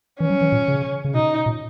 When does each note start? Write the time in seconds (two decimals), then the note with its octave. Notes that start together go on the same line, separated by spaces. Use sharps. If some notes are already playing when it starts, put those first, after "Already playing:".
0.20 E3 C#4
0.30 F#3
0.41 E3
0.52 A#2
0.68 C#3
1.05 C#3
1.15 B2 D#4
1.46 A#2